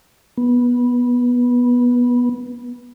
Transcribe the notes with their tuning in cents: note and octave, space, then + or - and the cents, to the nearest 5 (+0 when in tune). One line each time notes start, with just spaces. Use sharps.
B3 -15